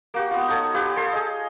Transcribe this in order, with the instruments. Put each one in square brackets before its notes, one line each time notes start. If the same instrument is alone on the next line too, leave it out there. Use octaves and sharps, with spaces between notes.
[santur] A#3 F#4 G4
B3 F4
D#4 F#4 A4 C#5
F4 G4 B4
A4 C#5 C6
G#4 D#5